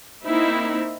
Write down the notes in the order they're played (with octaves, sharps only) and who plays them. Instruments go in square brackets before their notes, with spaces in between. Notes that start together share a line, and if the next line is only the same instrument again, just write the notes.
[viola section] A#3 C4 D#4 E4